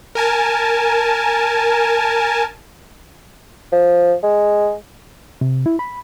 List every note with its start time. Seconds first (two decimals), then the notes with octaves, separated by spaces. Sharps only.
0.15 A#4 G#5 A5
3.72 F3
4.23 G#3
5.41 C3
5.66 E4
5.79 B5